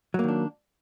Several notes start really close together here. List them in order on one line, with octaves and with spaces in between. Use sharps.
F#3 A#3 D#3 D4